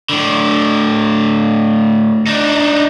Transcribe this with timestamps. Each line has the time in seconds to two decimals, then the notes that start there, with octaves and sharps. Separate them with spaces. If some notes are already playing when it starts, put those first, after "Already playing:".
0.09 A2 D3
2.27 D4 D#4